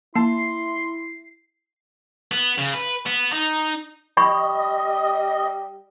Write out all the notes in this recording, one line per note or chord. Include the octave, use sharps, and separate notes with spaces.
A#3 E4 A5 C6 C7
B3
C#3
B4
B3
D#4
G3 D#5 B5 C#6